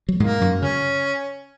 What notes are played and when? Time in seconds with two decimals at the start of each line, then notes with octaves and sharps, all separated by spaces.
0.09 F#3
0.20 G#2 G#3 A#3
0.41 F#2 F#3
0.62 C#3 C#4